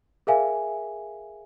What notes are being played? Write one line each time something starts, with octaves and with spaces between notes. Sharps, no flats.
G#4 A#4 E5 F5 G#5